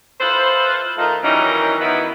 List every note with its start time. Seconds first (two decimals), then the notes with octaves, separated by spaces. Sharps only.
0.21 E4 F4 A4 B4 C5
0.97 D#3 A3 D#4 F4
1.23 D#3 E3 F#3 G3 C#4 D#4
1.80 D#3 B3 E4